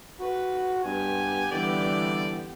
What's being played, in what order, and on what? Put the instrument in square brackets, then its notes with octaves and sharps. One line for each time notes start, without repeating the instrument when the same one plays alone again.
[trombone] F#4 [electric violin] B4
[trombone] G2 [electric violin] B3 G4 [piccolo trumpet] G#5
[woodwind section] D3 G3 [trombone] E3 [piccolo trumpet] D5